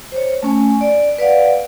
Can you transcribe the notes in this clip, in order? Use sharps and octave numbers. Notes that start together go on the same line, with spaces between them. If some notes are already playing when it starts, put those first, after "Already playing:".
C5 C#5
A3 C#4 G#5
D5
B4 D5 F5 F#5